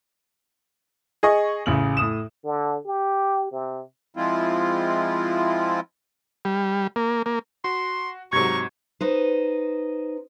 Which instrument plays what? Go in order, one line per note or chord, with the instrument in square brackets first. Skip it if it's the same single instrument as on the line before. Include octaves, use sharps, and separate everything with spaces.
[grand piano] G#4 D#5 C#6
A1 C#3 F#7
A2 D#6 E7
[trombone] D3
G4
C3
[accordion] F3 G#3 C4 E4 F4
[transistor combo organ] G3
A#3
A#3
[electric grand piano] F#4 [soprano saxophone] C6
[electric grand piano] G#2 G#6 [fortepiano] C3 F#3 [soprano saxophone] A#5 [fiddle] C#6
[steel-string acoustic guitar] D#4 B4 C5